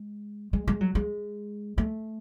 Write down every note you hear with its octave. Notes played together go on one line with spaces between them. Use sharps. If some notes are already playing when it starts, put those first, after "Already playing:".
Already playing: G#3
G#3
G#3
F#3
G#3
A3